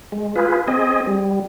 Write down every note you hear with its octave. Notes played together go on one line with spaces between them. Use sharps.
G#3
F4 G#4 B4
C4 G#4 D#5
G3